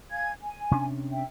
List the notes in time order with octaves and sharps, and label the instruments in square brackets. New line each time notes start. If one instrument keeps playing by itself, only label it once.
[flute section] F5 G#5 G#6
G#5
[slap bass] C3 C#4 D4
[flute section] E5 G5